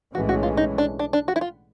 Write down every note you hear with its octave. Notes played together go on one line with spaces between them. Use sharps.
B1 A2 E3 G#3 C#4 F#4
F#4
F4
D#4
D4
D4
D4
F#4
E4
F4